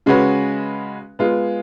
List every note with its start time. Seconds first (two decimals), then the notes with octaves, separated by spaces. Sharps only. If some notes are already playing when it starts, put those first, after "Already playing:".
0.06 C#3 G#3 C#4 F#4 B4
1.19 G#3 B3 F4